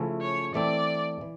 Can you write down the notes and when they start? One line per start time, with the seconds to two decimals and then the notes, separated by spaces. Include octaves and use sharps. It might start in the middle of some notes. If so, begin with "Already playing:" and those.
Already playing: C#3 F3 A3 C#4 E4
0.22 C#5
0.54 E3 A3 C4 D5
1.21 E3